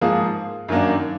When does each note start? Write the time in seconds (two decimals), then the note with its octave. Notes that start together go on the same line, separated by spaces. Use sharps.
0.01 G#2 F3 A#3 F4 G#4
0.69 F#2 D#3 F#3 A#3 D4